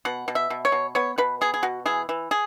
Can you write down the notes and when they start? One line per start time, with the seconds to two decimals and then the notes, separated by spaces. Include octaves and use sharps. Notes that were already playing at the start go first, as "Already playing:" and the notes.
0.05 B2 F#5
0.28 B2
0.35 E5
0.50 B2
0.65 C#5
0.72 B2
0.95 B3 C#5
1.18 B2 B4
1.41 B3 G#4
1.54 G#4
1.63 B2 F#4
1.86 E3 G#4
2.09 E3
2.31 G#4